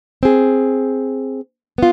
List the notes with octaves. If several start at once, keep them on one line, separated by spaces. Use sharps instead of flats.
C4 G#4
B3 F4